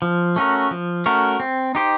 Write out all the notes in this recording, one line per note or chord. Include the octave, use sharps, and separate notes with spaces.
F3
A3 C#4 F#4 A#4
F3
A3 C#4 F#4 A#4
C4
D#4 G4 C5